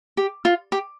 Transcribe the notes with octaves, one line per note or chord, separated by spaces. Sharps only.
G4
F4
G4